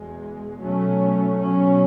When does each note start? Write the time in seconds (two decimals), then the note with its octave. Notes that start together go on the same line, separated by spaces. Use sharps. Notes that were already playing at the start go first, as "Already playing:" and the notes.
Already playing: E2 B2 G#3
0.60 B2 F#3 A3 C#4
1.39 B2 F#3 C#4